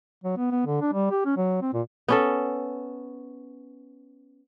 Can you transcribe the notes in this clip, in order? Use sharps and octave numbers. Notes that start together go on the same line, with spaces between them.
F#3
B3
B3
D3
D4
G3
G4
C#4
F#3
C4
A#2
B3 C#4 A4